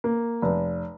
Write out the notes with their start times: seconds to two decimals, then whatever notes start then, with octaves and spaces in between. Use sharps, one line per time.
0.04 A#3
0.42 F1